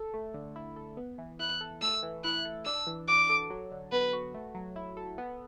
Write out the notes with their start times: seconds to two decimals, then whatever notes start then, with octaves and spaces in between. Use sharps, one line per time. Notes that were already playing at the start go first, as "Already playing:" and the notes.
Already playing: A4
0.14 A3
0.34 D3
0.56 E4
0.76 A4
0.97 B3
1.18 E3
1.39 E4 F#6
1.61 A4
1.81 A3 E6
2.03 E3
2.24 E4 F#6
2.45 A4
2.65 D4 E6
2.87 E3
3.08 F#4 D6
3.29 A4
3.50 F#3
3.71 D3
3.92 B3 B4
4.13 F#4
4.34 A3
4.55 F#3
4.76 E4
4.97 A4
5.18 B3